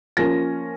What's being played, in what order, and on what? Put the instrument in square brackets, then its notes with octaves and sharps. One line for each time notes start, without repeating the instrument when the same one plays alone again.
[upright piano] F3 A#3 C#4 F4 A#6